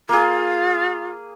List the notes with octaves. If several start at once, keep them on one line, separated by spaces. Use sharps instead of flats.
A#3 F4 G#4